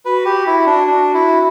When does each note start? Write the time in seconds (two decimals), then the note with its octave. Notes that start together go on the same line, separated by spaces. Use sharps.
0.05 F#4 B4
0.26 G4
0.47 E4
0.66 D4
0.87 D4
1.14 E4